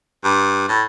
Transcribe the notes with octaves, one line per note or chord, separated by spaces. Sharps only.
G2
A2